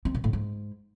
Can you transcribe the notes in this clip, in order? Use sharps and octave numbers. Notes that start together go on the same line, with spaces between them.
C4
B2
A2
G#2